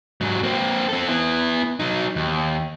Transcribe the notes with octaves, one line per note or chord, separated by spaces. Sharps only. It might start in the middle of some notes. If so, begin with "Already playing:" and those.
G#2 F#3
A#3 C4
C4 A4
B3 E4
F#3 D#4
D#2